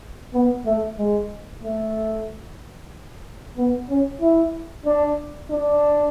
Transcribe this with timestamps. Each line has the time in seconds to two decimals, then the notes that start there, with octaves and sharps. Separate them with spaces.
0.33 B3
0.65 A3
0.98 G#3
1.63 A3
3.57 B3
3.89 C#4
4.21 E4
4.86 D4
5.51 D4